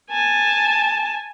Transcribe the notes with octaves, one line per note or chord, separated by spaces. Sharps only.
G#5 A5